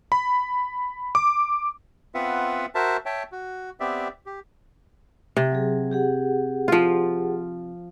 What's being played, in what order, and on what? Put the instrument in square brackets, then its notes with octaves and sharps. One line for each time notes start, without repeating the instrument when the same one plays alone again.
[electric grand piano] B5
D6
[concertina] B3 C4 F4 B4 E5 F#5
F#4 A#4 C5 E5 A5
C#5 E5 G5 A5
F#4
B3 C4 G4 D5 E5
G4
[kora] C3
[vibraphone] F#3 G#4
G4 G#4 F#5
[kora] F3 F4